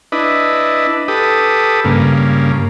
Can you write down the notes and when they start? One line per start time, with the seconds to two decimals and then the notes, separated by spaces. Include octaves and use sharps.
0.12 D4 E4 B4 D#5
1.08 G4 A4 B4 D#6
1.84 G2 C#3 A#3